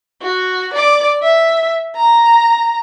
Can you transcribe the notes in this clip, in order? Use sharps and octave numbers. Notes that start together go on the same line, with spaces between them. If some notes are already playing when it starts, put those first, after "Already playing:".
F#4
D5 D6
E5
A#5